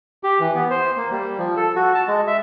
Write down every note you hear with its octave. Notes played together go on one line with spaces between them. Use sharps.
G4
E3
B3
C5
A#3
G3
F3
A4
F#4
A5
G#3
E5